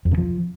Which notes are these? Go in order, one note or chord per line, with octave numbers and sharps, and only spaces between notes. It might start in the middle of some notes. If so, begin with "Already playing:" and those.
F2
C3
F3